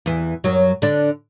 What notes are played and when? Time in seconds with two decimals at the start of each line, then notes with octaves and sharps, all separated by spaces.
0.06 E2 E3
0.44 F#2 F#3
0.82 D3 D4